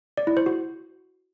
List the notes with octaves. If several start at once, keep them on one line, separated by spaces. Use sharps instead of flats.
D5
E4
C5
F#4